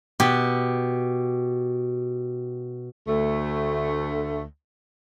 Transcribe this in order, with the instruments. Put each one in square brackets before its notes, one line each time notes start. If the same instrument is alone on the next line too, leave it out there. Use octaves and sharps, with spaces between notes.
[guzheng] B2 G4
[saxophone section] D2 A3